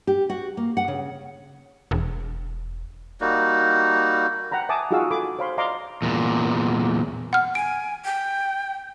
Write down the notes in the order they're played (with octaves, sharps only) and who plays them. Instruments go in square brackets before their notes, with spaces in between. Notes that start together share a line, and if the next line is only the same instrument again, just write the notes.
[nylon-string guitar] G4
F#4
A#3
F#5
C#3
[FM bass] E1
[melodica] G3 A#3 D#4 F#4
[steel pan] F#5 G5 A#5 B5
E5 G#5 A5 D6 D#6
D#4 F4 F#4 G#4 F5 E6
A4 G#5 B5 D6
C5 C#5 F5 B5 C6
D5 D#5 F5 A#5 C6 D6
[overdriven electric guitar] E2 A#2
[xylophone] F#5 F6
[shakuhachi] G#5 [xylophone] D7
[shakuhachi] G5